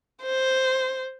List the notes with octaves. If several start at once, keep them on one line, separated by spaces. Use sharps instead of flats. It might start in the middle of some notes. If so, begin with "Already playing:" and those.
C5